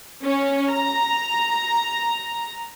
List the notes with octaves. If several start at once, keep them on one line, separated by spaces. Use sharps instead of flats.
C#4
A#5